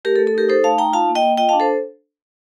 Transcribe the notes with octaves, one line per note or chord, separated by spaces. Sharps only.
A3 G4 A#4
A4
A3
A4
D#4 G4 A#4
D#4 A4 C5
A3 F5 A5
D#4 G5 A#5
F4 F5 A5
A#3
D#5 G5
A#3
F4 D#5 G5
F5 A5
D4
A4 C5